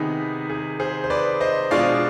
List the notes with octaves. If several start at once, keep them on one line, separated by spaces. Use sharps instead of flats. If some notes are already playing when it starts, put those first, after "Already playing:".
Already playing: C3 D#3 B3 D#4 G#4
G#4
G#4 C5
C5
B4 D5
C5 D#5
B2 G#3 D4 F4 D5 F5